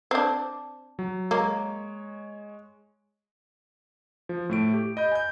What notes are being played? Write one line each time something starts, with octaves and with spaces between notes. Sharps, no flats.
C4 D4
F#3
G#3 A#3 C#5
F3
A2 A3 D7
G4
D#5 B5 G6
G#5 G6